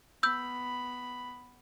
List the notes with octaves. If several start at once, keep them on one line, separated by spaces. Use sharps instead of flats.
B3 B5 E6 G6